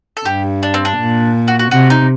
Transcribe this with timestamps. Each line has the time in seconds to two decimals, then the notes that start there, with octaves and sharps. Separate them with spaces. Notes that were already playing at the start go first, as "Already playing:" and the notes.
0.17 A4
0.25 G2 G4
0.63 D4
0.74 C4
0.85 D4
0.99 A#2
1.48 F#4
1.59 F#4
1.71 C3 F#4
1.90 D#4